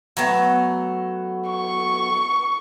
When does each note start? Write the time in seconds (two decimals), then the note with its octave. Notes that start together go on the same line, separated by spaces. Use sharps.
0.17 F#3 A3 B3
1.49 C#6